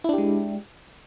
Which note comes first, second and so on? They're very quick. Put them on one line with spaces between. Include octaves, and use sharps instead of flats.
E4 D4 G4 G#3